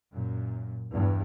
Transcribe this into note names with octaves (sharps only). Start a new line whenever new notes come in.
F#2 A#2
E2 G2